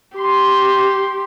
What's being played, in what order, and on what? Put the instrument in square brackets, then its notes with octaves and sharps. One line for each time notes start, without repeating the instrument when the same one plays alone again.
[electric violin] G4 [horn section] C6